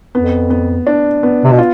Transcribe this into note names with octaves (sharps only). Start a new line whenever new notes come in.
F2 B3
B3
D4
B3
C3
B2
F4